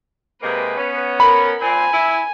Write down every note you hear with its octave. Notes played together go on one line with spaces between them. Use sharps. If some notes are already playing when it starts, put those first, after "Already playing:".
C3 G#3 A#3 B4
B3 C#4
A#4 B5
A#2 C4 G#5
E4